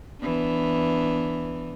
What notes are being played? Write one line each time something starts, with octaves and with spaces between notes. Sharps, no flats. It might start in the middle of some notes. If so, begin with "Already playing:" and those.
E3 B3 D4